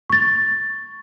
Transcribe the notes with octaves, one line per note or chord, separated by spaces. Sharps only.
C#6 A6